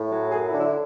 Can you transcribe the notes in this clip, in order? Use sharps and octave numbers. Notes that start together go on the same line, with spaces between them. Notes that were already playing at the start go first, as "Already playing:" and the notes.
Already playing: A2
F#3
F#2 G#4
E4
D3
E4